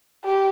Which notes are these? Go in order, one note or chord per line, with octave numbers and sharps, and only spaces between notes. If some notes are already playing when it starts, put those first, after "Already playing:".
G4